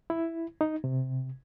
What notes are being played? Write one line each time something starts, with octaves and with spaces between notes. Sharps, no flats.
E4
D#4
C3